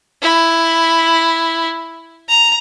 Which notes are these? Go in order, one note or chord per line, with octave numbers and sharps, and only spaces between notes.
E4
A#5